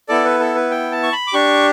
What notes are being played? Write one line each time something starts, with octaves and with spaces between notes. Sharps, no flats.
B3 E4 A4 D5
B4
A4
B4
G5
A5
C#6
B5
D6
D4 G4 C#6